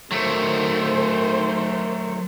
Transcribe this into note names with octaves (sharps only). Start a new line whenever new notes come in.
D#3 F#3 A3 C5